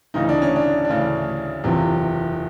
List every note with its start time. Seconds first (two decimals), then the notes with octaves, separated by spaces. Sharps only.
0.14 D2 C#3 E3 D#4
0.29 D4
0.42 C#4
0.56 D4
0.85 D4
0.89 D2 C#3 E3 C#4
1.64 F#1 E2 C3 F3